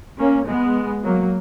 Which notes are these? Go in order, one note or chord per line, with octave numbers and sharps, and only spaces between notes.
A#3 C#4
G#3 B3
F#3 A#3